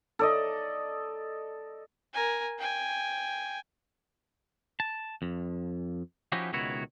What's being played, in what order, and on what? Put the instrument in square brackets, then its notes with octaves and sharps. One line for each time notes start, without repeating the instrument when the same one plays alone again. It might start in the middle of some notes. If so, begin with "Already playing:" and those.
[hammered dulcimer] A4 D5 D#5
[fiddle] A#4 G#5
G5 G#5
[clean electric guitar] A5
F2
F3 C#4 D#4 E4 F#4 G4
C#2 B2 D#3 E4 F#4 C#5